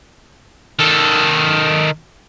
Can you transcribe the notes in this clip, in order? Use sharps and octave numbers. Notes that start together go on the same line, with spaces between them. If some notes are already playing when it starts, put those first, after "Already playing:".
D#3 A4